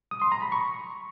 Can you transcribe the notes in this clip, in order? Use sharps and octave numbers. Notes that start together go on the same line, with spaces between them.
D#6
C6
A#5
B5
C#6